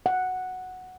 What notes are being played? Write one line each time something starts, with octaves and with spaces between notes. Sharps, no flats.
F#5